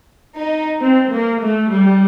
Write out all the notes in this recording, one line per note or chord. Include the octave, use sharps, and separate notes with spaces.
D#4
C4
A#3
A3
G3